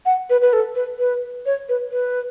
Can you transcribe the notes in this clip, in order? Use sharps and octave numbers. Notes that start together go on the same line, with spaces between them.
F#5
B4
B4
A4
B4
B4
C#5
B4
B4